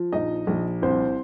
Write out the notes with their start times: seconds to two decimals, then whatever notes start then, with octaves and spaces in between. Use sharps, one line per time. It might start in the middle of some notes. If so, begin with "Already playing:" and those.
Already playing: F3
0.13 A#1 D#4 D#5
0.47 A#1
0.82 C2 C4 C5